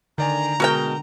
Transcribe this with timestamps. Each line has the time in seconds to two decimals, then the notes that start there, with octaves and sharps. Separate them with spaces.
0.18 D3 D#3 D5 G#5 A#5
0.60 B2 G#3 F#4 A#4 G5